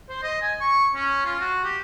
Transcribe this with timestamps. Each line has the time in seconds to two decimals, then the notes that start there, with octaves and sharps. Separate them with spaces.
0.09 C5
0.23 D#5
0.42 G#5
0.61 C#6
0.95 C#4
1.25 F4
1.40 F#4
1.64 G4